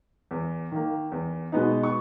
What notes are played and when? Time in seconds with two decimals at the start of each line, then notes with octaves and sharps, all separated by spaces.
0.31 E2
0.72 D#3 A#3
1.12 E2
1.52 B2 G#3 B3 D#4
1.83 C#6